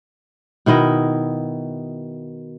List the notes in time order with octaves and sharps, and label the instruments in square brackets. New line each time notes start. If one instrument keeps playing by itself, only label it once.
[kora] B2 D#3 E4 D#5